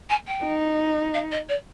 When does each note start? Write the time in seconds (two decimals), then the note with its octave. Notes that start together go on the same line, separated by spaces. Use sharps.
0.09 G#5
0.27 G5
0.44 D#4
1.14 F5
1.31 D#5
1.48 D5